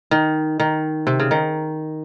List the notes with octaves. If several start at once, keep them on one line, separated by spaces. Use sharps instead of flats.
D#3
D#3
C3
C#3
D#3